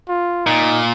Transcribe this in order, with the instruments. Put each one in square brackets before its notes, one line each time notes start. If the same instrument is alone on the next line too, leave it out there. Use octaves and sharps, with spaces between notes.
[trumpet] F4
[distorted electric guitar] A#2 [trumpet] D#4